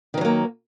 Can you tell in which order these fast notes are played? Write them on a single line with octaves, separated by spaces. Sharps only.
D#3 E3 F#3 A#3